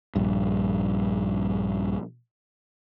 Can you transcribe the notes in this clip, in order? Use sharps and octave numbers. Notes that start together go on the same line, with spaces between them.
A#1 G2